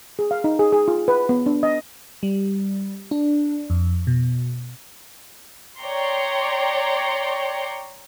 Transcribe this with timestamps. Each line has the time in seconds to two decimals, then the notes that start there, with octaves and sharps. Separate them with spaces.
0.19 G#4
0.31 F5
0.44 D#4
0.59 G#4
0.72 G#4
0.88 F4
1.08 B4
1.29 B3
1.46 D4
1.63 D#5
2.23 G3
3.11 D4
3.70 F2
4.07 B2
5.80 C#5 D5 G5 A#5 C6 C#6